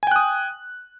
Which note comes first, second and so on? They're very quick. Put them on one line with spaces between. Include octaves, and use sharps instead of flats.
G#5 G5 F#6 D#6